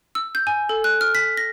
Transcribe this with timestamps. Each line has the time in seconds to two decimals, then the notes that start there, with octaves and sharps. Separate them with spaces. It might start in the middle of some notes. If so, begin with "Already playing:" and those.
0.15 E6
0.35 G6
0.47 G#5
0.69 A4
0.84 F#6
1.01 F6
1.15 B6
1.37 A#6